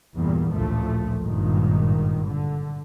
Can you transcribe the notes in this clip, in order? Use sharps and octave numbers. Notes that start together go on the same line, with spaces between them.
E2 G2 A#2 G3
A1 D2 A#2 F3 A3
G#1 G2 A#2 D#3
D3